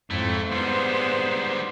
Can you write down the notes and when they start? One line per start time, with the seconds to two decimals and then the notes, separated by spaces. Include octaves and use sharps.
0.11 F2 G#2 A3 E4
0.52 G#2 G3 B3 C5